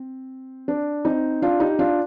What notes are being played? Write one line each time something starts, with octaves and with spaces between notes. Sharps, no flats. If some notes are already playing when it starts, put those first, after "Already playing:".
Already playing: C4
D4
C4 D#4
D4 F4
D#4 G4
D4 F4